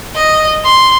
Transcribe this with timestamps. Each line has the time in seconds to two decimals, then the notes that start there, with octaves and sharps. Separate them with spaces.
0.16 D#5
0.65 C6